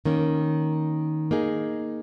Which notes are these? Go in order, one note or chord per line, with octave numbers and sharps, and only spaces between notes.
D#3 A#3 C#4
A#3 D#4 G#4